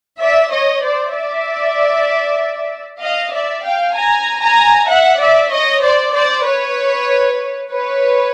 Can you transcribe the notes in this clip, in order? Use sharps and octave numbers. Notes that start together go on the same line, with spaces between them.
D5 E5
C#5 D#5
C5 D5
D5 E5
D#5 F5
D5 E5
F5 G5
G#5 A#5
G#5 A#5
E5 F#5
D5 E5
C#5 D#5
C5 D5
C5 D5
B4 C#5
B4 C#5